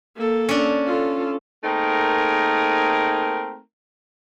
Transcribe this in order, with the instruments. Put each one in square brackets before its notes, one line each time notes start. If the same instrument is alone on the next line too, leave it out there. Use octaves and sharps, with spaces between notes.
[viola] A#3 A4
[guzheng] C#4 D4
[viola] F4 A4
[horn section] A3 A#3 C4 D#4 G#4 A#4